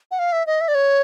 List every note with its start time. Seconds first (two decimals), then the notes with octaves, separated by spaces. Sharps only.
0.11 F#5
0.19 F5
0.33 E5
0.47 D#5
0.61 E5
0.68 D5
0.75 C#5